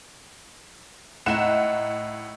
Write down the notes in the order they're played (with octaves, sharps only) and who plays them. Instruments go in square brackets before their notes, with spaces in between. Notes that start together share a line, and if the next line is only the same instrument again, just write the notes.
[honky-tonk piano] A2 F#5 E7 [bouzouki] D#4 E5